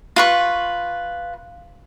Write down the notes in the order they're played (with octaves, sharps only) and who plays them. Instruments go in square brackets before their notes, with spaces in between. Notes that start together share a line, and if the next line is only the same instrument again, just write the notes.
[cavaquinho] F4 B4 C#6